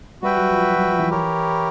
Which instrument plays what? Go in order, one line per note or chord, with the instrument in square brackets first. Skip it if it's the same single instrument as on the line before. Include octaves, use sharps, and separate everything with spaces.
[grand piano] G3 [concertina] F#4 B4 E5 G5
[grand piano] F#3
F3
F#3
F#3
F3
E3
[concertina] E4 G4 A#4 C#5